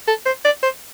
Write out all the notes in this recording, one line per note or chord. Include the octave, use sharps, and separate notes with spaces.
A4
C5
D5
C5